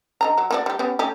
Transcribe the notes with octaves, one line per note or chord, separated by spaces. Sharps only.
D3 D#5 A#5
F#3
A#3 F#4 D5
G3 G4
B3 C#4 G4
A3 C#4 G4